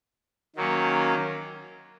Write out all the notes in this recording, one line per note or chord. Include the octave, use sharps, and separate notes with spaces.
D#3 F#3 A#3 C#4